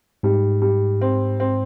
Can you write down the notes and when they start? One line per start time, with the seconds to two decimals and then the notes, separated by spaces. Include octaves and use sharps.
0.23 G#2 G3
0.62 G3
1.01 C4
1.40 C4